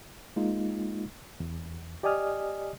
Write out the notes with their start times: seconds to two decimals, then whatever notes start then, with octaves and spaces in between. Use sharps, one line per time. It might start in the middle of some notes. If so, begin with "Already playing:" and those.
0.36 G#3 A#3 D#4 F4
1.40 E2
2.03 G4 D5 D#5 G#5 D#6 F6